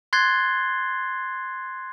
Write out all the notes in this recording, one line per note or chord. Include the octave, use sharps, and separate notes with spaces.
C6 F#6 G#6 A6 C7 G7